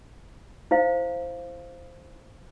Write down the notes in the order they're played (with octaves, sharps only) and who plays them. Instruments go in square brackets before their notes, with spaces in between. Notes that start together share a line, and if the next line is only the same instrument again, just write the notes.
[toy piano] E4 C5 F5